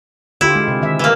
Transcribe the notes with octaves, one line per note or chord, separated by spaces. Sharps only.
D3 E4 F4 G4
G#3
C3
D#3 E5
E3 A#3